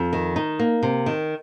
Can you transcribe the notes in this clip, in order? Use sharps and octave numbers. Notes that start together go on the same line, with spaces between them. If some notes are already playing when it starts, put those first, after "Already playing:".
Already playing: F2
D#3
D#4
A#3
C3
D#3